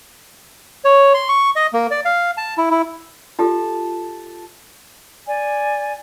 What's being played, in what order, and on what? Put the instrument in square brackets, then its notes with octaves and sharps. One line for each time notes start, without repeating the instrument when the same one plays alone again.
[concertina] C#5
C6
C#6
D#5
A#3
D5
F5
A5
E4
E4
[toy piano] F4 G4 A4 [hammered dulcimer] A5
[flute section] D5 G#5